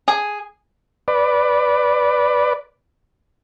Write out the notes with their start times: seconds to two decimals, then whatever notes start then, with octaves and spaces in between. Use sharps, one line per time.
0.08 G#4
1.08 B4 D5